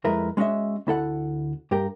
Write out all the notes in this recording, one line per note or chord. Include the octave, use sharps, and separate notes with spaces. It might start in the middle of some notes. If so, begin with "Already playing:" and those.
F2 G#3 A3 E4 A#4 B4
G#3 C#4 F#4 D#5 E5
D2 E4 A4 F#5
G2 G4 A#4 G5